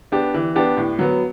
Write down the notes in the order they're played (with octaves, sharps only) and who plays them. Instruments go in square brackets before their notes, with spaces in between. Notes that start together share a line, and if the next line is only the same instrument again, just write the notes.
[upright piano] B3 D4 G4
E3
B3 D4 G4
A2
F#3 B3